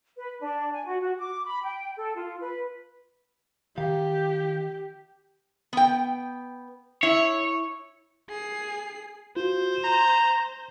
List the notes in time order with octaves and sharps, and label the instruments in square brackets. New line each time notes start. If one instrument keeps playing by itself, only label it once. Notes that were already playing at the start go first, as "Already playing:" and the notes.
[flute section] B4
D4
G#5
F#4
F#4
D6
B5
G5
A4
F4
B4
[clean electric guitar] D#3 F5 [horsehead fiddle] G4
[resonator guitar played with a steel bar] B3 G5
[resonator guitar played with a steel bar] E4 [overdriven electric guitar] C#5
[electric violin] G#4 C7
[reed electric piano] F4 F#4 [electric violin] C5
[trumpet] A#5 [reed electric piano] C6